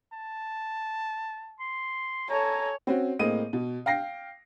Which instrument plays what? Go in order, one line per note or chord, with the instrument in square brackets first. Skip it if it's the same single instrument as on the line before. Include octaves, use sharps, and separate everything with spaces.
[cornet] A5
[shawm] C6
[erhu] A4 [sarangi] C#5 [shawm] G#5 [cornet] A#5
[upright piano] C4 C#4 F#4
A2 A#3 C4 G#4 D#5 D#7
B2
F5 G5 A#6 C7